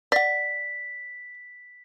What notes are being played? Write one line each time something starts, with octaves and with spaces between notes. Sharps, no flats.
D5 F#5 B6